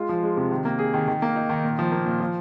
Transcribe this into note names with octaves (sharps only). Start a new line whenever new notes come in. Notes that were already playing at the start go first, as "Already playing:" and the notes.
Already playing: G#3 F4
F3
G#3
C3
D#3
A#3
G#4
D#3
D#3
A#3
D#4
D#3
A#2
F3
A#3
A#2
F3